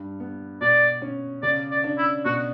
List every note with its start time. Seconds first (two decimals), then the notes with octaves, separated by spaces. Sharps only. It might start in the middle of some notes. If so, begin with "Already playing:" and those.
Already playing: G2
0.20 B3
0.61 B2 D5
1.02 C#4
1.43 C#3 D5
1.71 D5
1.84 D4
1.98 E4
2.25 B2 F#4